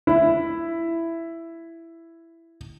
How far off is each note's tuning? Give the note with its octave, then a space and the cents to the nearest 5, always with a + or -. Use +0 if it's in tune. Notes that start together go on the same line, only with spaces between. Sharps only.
E4 +10